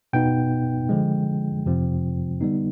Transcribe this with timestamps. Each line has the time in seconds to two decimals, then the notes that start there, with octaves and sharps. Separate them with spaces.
0.13 B2 B3 D#4 G5
0.89 D3 F3 G#3
1.66 F2 C3 F3 C4
2.41 D3 G3 B3 D#4